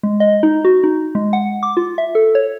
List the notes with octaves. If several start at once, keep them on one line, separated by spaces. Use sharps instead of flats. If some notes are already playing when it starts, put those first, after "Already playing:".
G#3
D#5
D#4
F#4
D#4
G#3
F#5
D6
F4
E5
A4
C#5